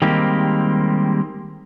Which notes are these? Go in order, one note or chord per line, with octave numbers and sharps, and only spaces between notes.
D#3 G3 G#3 A#3 C4 G4